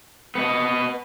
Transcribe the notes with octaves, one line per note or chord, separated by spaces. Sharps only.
B3 D#5